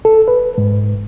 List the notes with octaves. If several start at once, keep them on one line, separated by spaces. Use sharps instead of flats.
A4
B4
G#2